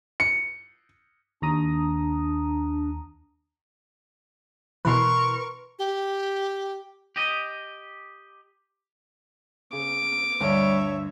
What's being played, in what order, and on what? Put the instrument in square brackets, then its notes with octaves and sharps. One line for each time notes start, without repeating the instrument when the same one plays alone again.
[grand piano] C#7
[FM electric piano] D#2 A#5 D#6 [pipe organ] D4
[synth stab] B2 E3 [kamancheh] A#4 C#6 [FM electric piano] B4 C6
[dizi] G4
[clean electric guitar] G4 D#5
[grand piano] C#3 [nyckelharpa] D6
[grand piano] D2 G2 [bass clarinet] G3 [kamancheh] C#5 E5